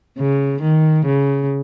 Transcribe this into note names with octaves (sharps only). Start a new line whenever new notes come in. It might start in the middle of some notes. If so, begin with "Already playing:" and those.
C#3
D#3
C#3